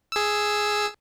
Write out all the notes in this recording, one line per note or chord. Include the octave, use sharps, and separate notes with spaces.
G#4 E6